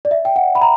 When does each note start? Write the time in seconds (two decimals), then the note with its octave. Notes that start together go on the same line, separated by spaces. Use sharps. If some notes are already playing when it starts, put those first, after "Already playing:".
0.05 D5
0.11 E5
0.25 G5
0.36 F#5
0.55 B5
0.61 A#5